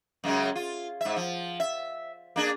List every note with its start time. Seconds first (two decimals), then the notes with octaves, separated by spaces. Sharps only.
0.24 F#2 C#3 G#3
0.56 F4
1.01 G#2 E5
1.16 F3
1.60 E5
2.36 A#3 D4 G#4